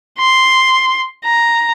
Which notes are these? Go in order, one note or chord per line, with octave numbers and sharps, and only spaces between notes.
C6
A#5